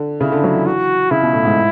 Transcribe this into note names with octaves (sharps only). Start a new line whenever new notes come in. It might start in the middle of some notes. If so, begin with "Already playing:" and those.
Already playing: D3
C#3 E4
D3
F#3
E3
F#4
C#3 E4
B2
A2
G#2